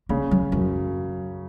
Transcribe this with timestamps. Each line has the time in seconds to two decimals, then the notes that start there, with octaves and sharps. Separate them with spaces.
0.09 C#3 A#3
0.31 F#3
0.52 F#2 E3